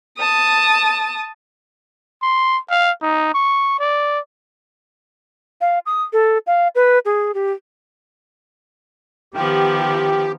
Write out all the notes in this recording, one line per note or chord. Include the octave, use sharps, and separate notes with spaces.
A5 D#6
C6
F5
D#4
C#6
D5
F5
D#6
A4
F5
B4
G#4
G4
D#3 F3 B3 G4